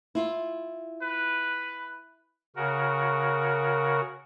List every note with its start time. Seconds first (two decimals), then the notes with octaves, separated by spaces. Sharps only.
0.15 E4 F4
1.02 B4
2.56 C#3 F#4 A#4